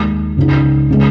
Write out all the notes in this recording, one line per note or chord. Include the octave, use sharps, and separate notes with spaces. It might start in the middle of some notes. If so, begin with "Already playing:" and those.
Already playing: D#2 D#3 G#3
C#2 C#3 G#3 D#4
C#3 G#3